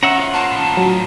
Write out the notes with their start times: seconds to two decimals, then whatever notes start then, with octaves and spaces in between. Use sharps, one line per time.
0.03 D#3 C#4 E5 F#5 A#5
0.18 F4 C5 F#5
0.34 A#3 A5
0.51 A2 D#3
0.77 F#3